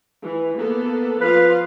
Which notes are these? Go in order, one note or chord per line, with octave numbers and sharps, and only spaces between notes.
E3
A#3 B3 A4
F3 F4 B4 F5